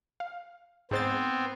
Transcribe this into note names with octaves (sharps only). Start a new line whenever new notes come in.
F5
G#2 B3 C4 C5 A6